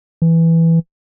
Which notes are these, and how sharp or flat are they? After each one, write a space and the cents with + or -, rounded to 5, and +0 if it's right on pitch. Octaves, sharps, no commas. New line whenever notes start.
E3 +0